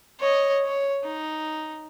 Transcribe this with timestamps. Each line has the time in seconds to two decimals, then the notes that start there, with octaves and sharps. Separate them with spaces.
0.20 C#5 D#5
0.65 C#5
1.03 D#4